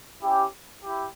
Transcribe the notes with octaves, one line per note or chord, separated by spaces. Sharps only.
C#4 E4 G4
E4 G4